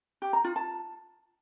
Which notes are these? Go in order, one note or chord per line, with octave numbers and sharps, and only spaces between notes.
G4
A#5
F4
A5